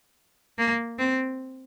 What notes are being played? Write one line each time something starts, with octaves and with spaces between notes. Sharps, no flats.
A#3
C4